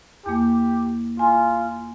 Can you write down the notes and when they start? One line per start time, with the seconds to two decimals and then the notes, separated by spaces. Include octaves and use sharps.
0.26 E2 A#3 G4
1.19 F4 G#5